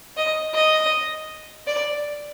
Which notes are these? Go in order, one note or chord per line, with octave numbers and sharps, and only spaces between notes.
D#5
D#5
D5